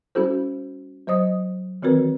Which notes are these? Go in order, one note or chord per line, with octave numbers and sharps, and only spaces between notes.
G3 C#4 E4 F#4 A4 C5
F#3 C5 D#5 D#6
D#3 E3 C4 F#4 A#4 B4